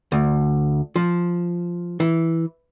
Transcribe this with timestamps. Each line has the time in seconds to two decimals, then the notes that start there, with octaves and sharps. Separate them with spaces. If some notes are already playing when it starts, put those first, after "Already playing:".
0.12 D2
0.96 F3
2.00 E3